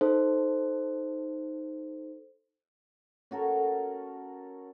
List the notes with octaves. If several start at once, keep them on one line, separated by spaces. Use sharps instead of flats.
D#4 A4 C5
C#4 F#4 A4 A#4